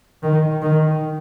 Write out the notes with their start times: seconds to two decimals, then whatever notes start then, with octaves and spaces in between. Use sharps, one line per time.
0.22 D#3
0.62 D#3